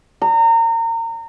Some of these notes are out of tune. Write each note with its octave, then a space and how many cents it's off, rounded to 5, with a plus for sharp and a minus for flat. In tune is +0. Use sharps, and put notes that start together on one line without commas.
A#5 -30